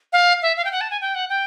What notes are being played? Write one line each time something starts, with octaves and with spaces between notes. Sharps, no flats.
F5
E5
F5
G5
F#5
A5
G#5
G5
F#5
G5